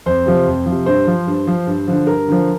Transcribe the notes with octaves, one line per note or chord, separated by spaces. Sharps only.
F2 C5
C3 F3
F2
C3 F3
G2 C5
F3
G2
F3
G2
D3 F3
G2 A#4
D3 F3